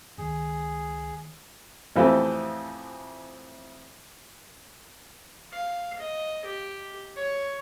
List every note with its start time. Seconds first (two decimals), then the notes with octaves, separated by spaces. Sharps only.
0.18 C#2 D#3 G#4
1.96 A1 F2 E3 C4 G4 A4
5.52 F5
5.99 D#5
6.45 G4
7.16 C#5